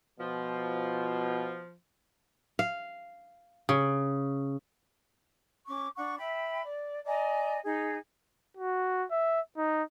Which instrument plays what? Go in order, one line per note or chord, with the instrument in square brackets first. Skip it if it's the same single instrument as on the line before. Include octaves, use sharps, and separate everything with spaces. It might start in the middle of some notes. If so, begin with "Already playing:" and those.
[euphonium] B2 [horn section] F3
[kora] F5
C#3
[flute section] C#4 C#6 D6
D4 F#5 C#6
E5 G5 B5
D5
D5 D#5 G#5 A#5
D#4 G#4
[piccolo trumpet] F#4
E5
D#4